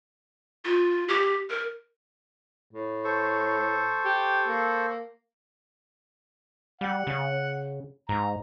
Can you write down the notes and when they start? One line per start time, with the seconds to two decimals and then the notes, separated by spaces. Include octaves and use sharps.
0.65 F4
1.08 G4
1.50 A#4
2.73 A2
3.05 A4 C5 C#6
4.05 G4
4.48 A#3
6.81 G3 F#5
7.07 C#3
8.09 G#2 A#5